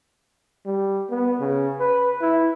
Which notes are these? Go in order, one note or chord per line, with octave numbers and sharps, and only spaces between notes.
G3
B3
C#3
B4
E4